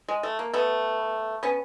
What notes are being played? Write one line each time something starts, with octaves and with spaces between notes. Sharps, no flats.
G#3
A3
A#3
A3 B3
B3 C#4